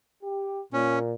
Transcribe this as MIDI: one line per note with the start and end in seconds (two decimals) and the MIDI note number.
0.23 0.62 67
0.73 1.15 46
0.73 0.99 61